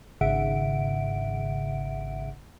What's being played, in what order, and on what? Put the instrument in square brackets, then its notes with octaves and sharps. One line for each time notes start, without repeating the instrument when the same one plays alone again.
[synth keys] G#1 G#2 C#3 E5 F#5 D7